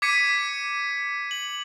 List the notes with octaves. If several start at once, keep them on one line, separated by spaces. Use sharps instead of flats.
D6 G#6 B6 C#7 D#7
F#7